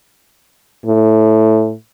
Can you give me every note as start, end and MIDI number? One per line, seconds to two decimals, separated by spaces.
0.86 1.73 45